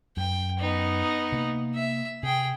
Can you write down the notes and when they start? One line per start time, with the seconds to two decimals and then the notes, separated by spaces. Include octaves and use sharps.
0.17 F#2 G5
0.59 B3 D#4
1.32 C3 A#3
1.75 E5
2.23 C3 G#4 G5